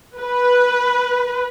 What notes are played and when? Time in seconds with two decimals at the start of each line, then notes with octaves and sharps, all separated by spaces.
0.18 B4